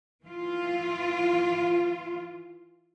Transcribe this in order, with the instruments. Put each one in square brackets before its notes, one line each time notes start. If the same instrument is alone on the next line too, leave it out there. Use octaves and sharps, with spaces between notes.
[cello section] E3 F4